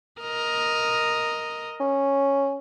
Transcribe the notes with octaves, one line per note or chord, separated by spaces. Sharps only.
A#4 D#5
C#4